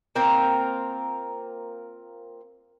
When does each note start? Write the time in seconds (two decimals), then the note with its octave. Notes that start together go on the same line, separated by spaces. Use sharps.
0.15 A#3 C4 F4 A#4